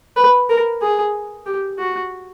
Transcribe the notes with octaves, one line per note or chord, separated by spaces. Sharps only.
B4
A#4
G#4
G4
F#4